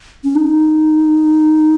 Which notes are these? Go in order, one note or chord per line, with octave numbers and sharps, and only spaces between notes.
C#4
D#4